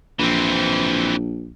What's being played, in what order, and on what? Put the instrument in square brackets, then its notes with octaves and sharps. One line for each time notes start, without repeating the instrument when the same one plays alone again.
[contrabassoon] A#1 [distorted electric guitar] E3 C4